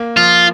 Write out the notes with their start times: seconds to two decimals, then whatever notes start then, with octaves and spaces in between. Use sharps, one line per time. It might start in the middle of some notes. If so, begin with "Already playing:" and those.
Already playing: A#3
0.17 F3 F4